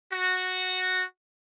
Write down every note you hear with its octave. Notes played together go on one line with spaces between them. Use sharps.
F#4